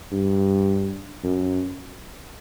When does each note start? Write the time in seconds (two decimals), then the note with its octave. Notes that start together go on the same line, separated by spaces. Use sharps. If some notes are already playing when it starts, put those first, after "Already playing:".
0.12 G2
1.24 F#2